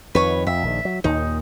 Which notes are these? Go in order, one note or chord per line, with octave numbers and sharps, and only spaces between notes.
F2 D#3 B4 C#5
F2 E5
A#1 D#3
F#3
D#2 A#2 D#3 D#4